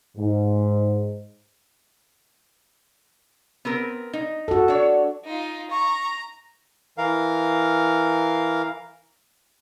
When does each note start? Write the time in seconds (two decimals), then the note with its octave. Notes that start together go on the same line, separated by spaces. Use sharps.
0.17 G#2
3.65 B3 C4 A#4
4.13 D#4
4.48 F#4 A4
4.68 D4 C#5
5.24 D#4 F4
5.70 A#5 C#6
6.98 E3 A#4 F5